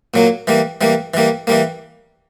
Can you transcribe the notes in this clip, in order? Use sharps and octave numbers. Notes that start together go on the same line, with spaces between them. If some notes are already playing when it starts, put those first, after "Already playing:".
A#2 F#3 A#3
E3 G3 A#3
E3 G3 A#3
E3 G3 A#3
E3 G3 A#3